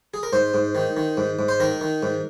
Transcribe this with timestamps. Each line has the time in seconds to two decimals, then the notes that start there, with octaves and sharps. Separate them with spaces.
0.14 G#4
0.23 A#4
0.33 G#2 C5
0.54 G#2
0.75 D#3
0.97 D#3
1.17 G#2
1.39 G#2
1.48 C5
1.60 D#3 A#4
1.81 D#3
2.03 G#2